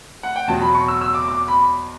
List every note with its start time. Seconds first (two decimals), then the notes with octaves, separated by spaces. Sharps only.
0.23 F#5
0.36 G5
0.47 E2 B2 F#3 A5
0.62 B5
0.75 C#6
0.88 E6
1.02 E6
1.15 D6
1.28 D6
1.48 B5